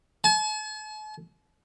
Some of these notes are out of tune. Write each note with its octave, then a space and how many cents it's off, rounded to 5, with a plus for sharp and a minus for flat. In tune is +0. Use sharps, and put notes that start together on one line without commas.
A5 -45